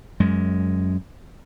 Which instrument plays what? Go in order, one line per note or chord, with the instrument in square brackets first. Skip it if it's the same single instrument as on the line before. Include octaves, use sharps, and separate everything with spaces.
[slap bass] F#2 G#3